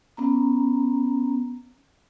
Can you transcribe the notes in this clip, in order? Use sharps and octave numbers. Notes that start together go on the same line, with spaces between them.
B3 C#4 A#5